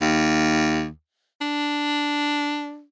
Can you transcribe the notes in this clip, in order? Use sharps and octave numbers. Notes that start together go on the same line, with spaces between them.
D#2
D4